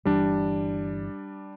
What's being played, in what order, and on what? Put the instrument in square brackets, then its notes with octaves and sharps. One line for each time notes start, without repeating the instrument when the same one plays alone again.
[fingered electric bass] G1 E3 [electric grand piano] G3 D4